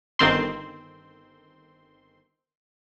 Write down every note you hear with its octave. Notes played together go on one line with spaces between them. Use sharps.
G1 D#3 C4 C6